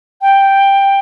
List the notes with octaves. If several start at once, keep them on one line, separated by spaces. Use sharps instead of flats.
G5